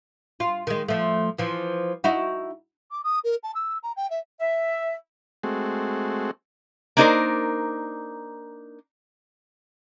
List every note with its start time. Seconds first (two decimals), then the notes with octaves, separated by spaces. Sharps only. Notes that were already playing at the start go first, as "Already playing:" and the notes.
0.40 F4
0.67 D#3 G#3
0.88 F3 A3
1.38 E3 F3
2.04 D#4 E4 F#4
2.91 D6
3.04 D#6
3.24 A#4
3.43 A5
3.55 E6
3.83 A#5
3.96 G5
4.10 E5
4.40 E5
5.43 G#3 A3 C4 F#4
6.97 A#3 D4 D#4 A#4 C5 D5